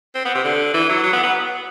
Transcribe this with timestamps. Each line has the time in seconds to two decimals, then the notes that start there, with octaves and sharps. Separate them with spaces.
0.15 C4
0.25 B3
0.35 C3
0.44 D3
0.74 E3
0.89 F#3
1.03 F#3
1.13 B3
1.23 B3